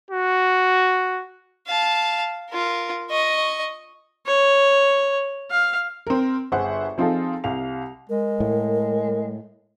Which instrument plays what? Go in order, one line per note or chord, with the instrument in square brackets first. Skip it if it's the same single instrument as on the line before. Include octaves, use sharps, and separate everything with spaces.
[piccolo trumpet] F#4
[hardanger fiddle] F5 A5
F4 A#4
D#5 C#6
[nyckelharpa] C#5
F5
[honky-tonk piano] C4 A#4
G1 G#4 C5 E5 F#5
F3 C4 D#4 F4 G#4 A4
C2 F5 F7
[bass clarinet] G#3 [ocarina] A#4
[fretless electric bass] A2